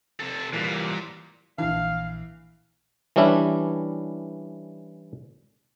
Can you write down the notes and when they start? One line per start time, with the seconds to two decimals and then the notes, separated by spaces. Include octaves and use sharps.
0.20 C3 A4
0.54 A#2 E3 G3
1.58 A#1 E3 D4 F5
3.16 E3 G3 C#4 D4 E4